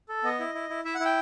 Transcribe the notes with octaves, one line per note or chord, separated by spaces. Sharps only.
A4
B3 D#5
E4
E4
E4
E4 E5
F#5
E4
G5